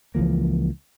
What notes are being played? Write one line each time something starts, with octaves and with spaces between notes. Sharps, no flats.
C#2 E3 F3 A#3